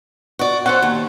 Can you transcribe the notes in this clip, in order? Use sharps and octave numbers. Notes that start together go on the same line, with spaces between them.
F#4 D5
C#4 A4 C5 F#5
D#2